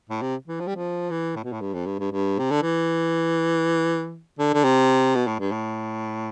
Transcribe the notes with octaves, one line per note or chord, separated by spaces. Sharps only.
A2
C3
E3
F3
G3
F3
E3
A2
B2
A2
G2
F2
G2
G2
G2
C3
D3
E3
D3
D3
C3
B2
A2
G2
A2